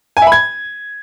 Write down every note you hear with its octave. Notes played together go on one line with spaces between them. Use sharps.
G#5
E5
B5
G#6